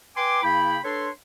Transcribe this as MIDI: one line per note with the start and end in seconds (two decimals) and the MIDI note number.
0.16 0.42 71
0.16 0.42 79
0.16 0.42 80
0.16 0.42 84
0.16 0.42 86
0.43 0.78 49
0.43 0.78 58
0.43 0.78 64
0.43 0.78 79
0.43 0.78 83
0.84 1.09 62
0.84 1.09 69
0.84 1.09 71
0.84 1.09 73
0.84 1.09 84